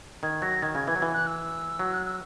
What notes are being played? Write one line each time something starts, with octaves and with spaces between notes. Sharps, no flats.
D#3 G#6
F#3 A#6
D#3 G#6
C#3 G#6
E3 G#6
F#3
E3
F#6
E6
F#3
F#6
E6